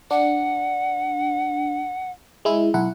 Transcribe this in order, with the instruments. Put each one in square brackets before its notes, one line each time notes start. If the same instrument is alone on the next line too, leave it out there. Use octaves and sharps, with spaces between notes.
[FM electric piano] D4 [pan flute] F#5
[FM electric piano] G#3 E4
B1 E4 F#5